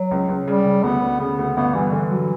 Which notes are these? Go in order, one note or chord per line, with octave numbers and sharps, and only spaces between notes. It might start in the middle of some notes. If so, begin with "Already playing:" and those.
Already playing: F#3
C#2
C#2
C#3 G3
C#3
D2 B3
D2
C#3 B3
D2
G1 B3
G2 E3
D3 E3
F#3